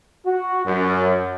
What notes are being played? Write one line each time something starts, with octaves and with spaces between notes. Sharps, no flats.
F#4
F#2